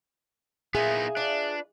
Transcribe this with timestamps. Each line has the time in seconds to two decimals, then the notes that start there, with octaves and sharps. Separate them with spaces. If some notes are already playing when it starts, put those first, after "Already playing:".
0.75 A#2 B3 D#4 E4 G#4 E5 F5
1.17 D4 F4 B4 D5